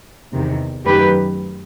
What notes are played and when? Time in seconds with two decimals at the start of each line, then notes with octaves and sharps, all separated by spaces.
0.33 E2 C3 D#3
0.86 F#2 D#3 A3 G4 B4